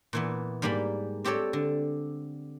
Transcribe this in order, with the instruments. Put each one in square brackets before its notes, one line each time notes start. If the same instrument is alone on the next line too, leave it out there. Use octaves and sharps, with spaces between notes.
[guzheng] A#2 E3 B3
G#2 G3 A#3 G4 B5
C4 G4 A4 C#5 D5
D3